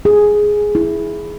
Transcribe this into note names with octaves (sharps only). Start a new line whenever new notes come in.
G#4
E4